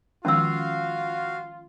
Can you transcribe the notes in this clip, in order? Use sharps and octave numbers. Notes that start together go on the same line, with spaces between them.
D#3 F3 G#3 C#4 F4 F#4 F5 E6